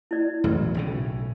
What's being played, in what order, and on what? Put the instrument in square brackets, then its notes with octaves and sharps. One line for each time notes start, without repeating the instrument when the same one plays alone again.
[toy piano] E4 D5
[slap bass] E1 A1 F#3
B1 A2 C#3